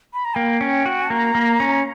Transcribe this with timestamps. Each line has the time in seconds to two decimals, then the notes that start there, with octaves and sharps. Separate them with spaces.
0.14 B5
0.25 A#5
0.36 A#3 G5
0.61 C#4
0.86 F#4
1.10 A#3 A#5
1.35 A#3
1.60 C#4